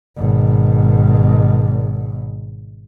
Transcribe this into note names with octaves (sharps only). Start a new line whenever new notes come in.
G#1 B2